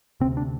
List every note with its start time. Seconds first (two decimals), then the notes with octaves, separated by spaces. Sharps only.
0.20 C3 C4
0.24 D2
0.37 D4